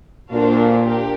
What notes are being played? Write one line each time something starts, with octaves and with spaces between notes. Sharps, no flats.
A#2 D4 F#4 A4 C5 F5
D4 G4 A#4